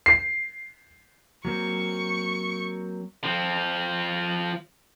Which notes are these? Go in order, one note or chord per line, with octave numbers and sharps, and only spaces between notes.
C7
F#3 A#3 C4 C#6
F3 C4